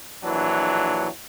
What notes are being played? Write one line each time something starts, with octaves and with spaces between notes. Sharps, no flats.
A#1 E3 F#3 D4